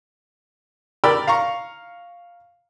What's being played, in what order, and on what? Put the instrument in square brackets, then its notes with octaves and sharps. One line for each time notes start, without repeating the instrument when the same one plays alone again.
[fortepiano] A#4 D5 G5 B5 E6
F5 A#5 C#6